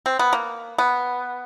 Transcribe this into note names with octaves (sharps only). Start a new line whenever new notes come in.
C4
B3
A#3
B3